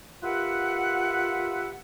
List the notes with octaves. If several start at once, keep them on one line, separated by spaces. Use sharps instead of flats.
F4 G4 A#4 B4 E5 F#5